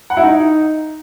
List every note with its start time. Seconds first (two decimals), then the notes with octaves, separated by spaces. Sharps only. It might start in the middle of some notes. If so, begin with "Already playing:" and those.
0.10 F#5
0.17 E4
0.23 D#4